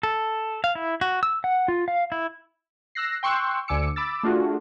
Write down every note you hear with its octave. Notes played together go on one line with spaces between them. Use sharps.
A4
F5
E4
F#4
E6
F#5
F4
F5
E4
E6 F#6 A#6 C7
G5 C6 C#6 E6 F#6
D2 D3 G#5 D6 E6 C#7
B5 D6 E6 A6
A3 D4 F4 F#4 G#4